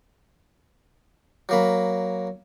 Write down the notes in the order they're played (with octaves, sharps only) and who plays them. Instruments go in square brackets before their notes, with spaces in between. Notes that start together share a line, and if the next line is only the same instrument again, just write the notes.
[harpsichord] F#3 A#3 B5